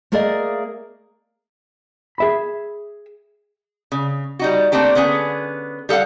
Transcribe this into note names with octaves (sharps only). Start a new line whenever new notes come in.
A3 A#3 G#4 A#4 D5 D#5
G#4 E5 B5
C#3
G3 D#4 F#4
A3 A#3 C4 D4 G4
D3 B3 C#4 G#4
G3 A4 F5 F#5